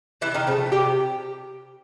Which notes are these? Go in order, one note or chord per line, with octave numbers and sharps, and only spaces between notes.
C3 E3 E4
D#3 D#4
C#3 F3 A3 C#4
C3 G3 G4